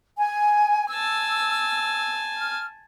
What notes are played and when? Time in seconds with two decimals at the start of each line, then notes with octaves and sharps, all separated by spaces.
0.18 G#5
0.88 G#5 A5 E6
2.37 F6